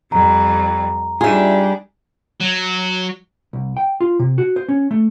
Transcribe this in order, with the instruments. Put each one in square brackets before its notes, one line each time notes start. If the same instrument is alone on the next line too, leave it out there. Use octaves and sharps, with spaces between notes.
[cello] F2 G3 [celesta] A#5
[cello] G3 D4 [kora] D#4 G#4 [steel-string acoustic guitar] F4 E5
[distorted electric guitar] F#3
[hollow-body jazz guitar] C2
G5
F4
C3
F#4
C5
C#4
A3